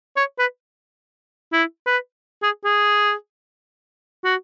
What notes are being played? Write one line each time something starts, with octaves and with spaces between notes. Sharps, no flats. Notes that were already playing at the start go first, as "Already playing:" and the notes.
C#5
B4
E4
B4
G#4
G#4
F#4